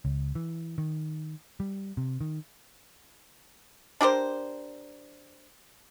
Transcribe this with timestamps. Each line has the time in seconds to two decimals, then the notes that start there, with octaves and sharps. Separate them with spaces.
0.05 C#2
0.35 E3
0.78 D#3
1.60 G3
1.97 C3
2.21 D#3
4.01 D4 G4 A#4 C5